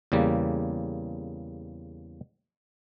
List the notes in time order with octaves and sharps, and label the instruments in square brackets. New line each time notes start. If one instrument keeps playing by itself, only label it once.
[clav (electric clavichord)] E2 C#3 G3 A#3